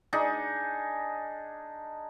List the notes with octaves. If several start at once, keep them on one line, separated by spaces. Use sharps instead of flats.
D4 D#4 G#4